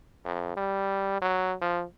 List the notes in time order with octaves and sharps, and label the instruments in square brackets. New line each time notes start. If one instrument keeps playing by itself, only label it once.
[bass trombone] F2
G3
F#3
F3